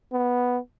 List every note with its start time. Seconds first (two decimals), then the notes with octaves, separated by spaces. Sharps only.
0.13 B3